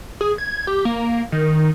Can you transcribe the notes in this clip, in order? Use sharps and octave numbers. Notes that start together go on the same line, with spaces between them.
G#4
G#6
G4
A#3
D#3